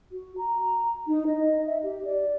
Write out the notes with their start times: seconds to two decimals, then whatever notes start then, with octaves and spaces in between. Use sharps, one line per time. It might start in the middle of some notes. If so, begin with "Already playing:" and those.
0.12 F#4
0.38 A#5
1.07 D#4
1.27 D#5
1.66 E5
1.83 G4
2.04 D5